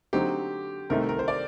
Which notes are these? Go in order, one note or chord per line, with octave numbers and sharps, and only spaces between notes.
D3 F#3 C4 D#4 G4
C2 C3 D#3 A3 D#4 A#4
A#4
C5
D5